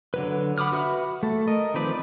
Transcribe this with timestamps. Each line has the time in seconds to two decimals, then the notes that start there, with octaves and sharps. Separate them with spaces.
0.14 D3 F#3 B4
0.58 F#5 B5 D6 D#6 F6
0.72 F#4 B4 E5 F#5 B5
1.23 A3 A4
1.48 A#4 D#5
1.74 D#3 F3 C4 B4 D5